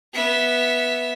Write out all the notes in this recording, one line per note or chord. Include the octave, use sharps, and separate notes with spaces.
B3 E5